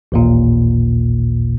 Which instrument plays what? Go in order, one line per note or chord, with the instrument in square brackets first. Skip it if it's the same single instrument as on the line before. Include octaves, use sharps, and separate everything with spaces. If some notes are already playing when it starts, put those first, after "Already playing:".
[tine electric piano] A1 D#2 A#2